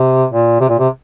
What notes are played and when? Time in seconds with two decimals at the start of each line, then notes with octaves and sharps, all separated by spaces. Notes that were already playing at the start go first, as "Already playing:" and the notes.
Already playing: C3
0.31 A#2
0.60 C3
0.69 A#2
0.79 C3